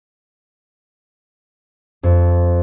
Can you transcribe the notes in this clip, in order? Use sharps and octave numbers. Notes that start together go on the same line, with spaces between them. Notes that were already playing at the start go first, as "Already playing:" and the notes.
F2